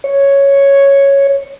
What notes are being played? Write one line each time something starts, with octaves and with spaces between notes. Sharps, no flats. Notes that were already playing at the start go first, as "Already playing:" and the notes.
C#5